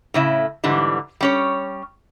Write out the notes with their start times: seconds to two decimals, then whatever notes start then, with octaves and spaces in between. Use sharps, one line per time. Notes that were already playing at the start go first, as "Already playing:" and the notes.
0.14 A2 C#3 E4
0.64 G#2 D3 E3 G3
1.21 G3 C#4 C#5